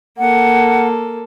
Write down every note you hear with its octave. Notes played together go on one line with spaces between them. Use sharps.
A#3 A4 F#5